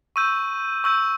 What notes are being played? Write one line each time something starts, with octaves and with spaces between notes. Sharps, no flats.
C#6 E6 G6 D#7
C#6 E6 G6